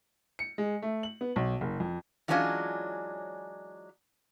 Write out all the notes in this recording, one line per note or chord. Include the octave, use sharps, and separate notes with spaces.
C#7
G#3
A3
F#7
B3
B1
F#1
F2
E3 F#3 G#3 C#4 D4 F4